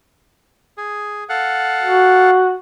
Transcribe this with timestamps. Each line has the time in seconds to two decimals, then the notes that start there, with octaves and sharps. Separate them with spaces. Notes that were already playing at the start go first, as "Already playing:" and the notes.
0.78 G#4
1.29 A4 F5 F#5
1.83 F#4